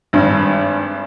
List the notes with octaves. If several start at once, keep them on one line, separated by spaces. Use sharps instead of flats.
G#1 G2